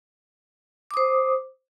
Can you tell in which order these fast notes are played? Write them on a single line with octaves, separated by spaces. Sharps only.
D6 D#6 C5